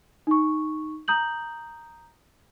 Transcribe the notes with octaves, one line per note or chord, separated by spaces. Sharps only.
D#4 C#6
A#5 D#6 G6 F#7